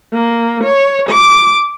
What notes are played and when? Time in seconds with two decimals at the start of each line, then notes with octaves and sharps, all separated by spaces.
0.13 A#3
0.64 C#5
1.09 D6